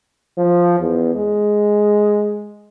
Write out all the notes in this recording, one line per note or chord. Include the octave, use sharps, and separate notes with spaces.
F3
E2
G#3